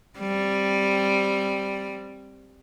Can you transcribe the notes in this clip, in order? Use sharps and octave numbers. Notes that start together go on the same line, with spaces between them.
G3 C4